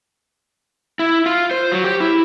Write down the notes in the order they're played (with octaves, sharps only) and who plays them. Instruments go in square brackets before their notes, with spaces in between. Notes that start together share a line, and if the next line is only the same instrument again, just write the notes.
[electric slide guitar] E4
F4
C5
F#3
G4
E4